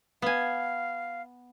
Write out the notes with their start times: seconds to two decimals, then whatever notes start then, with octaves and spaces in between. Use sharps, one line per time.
0.22 B3 F5 G#5